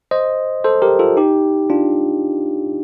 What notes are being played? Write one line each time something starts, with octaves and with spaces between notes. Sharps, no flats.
C5 D#5
A4 C5
G4 A#4
F4 A4
D#4 G4
D4 F4